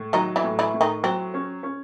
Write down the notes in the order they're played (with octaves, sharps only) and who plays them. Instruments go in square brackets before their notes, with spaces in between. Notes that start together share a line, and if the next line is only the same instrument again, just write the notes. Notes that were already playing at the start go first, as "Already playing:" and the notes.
Already playing: [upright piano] A2
[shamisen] D#3 D#4 [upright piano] F#3
[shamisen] E3 E4
[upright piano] A2
[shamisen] E3 E4
[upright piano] A2
[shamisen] D#3 D#4
[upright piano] F#3 [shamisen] C4
[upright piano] C#4
C#4